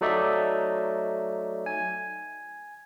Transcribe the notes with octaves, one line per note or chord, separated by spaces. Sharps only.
F#3 A3 D#4 D5 E5
G#5